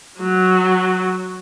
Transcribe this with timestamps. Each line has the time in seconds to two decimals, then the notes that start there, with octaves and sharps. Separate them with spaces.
0.20 F#3